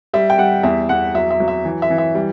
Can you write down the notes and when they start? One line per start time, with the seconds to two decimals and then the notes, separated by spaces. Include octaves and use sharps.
0.13 G3 E5
0.30 G5
0.38 G3 F#5
0.63 E2 E5
0.89 E2 F#5
1.14 F#3 E5
1.31 E5
1.40 F#3
1.48 E5
1.65 E3
1.82 E5
1.90 E3
1.98 E5
2.15 G3